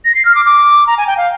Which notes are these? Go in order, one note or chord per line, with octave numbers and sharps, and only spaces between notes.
A#6
C7
F6
D6
D6
A#5
G#5
G5
F5